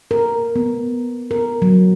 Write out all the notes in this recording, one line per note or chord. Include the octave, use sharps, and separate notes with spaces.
A#4
B3
A#4
F#3